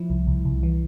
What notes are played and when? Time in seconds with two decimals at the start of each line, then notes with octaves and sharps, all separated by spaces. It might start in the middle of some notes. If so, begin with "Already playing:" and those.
Already playing: F3 E4
0.10 C2
0.27 C2
0.45 C2
0.63 E3